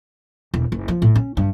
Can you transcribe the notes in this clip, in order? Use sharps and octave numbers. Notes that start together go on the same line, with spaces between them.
E1
F#1
F3
A2
C#4
G2